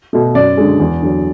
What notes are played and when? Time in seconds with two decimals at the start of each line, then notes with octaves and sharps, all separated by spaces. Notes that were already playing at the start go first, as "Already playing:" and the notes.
0.13 B2 A3
0.35 F#2 D5
0.57 D3 G#3
0.80 E2
1.02 D3 F#3